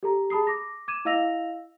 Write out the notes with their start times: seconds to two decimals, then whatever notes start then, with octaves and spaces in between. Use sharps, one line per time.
0.03 G4 A4 A#5
0.30 G#4 A5 B5 D#6 C7
0.47 D6 A#6
0.88 D6 G#6 D#7 E7
1.05 E4 D#5 F5 E6 A#6 F7